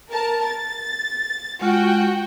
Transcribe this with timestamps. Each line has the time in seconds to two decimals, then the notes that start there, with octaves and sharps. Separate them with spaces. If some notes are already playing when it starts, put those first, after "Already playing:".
0.11 A#4 A5
0.46 A6
1.61 G#3 F4 F#4 G5